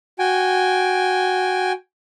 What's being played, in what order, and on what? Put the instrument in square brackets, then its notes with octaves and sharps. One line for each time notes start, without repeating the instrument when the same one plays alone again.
[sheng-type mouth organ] F#4 G5 G#5